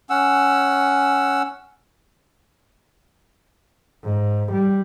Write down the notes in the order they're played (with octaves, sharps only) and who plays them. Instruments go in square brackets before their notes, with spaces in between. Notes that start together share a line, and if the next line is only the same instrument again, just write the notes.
[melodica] C#4 F#5 E6
[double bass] G#2
G3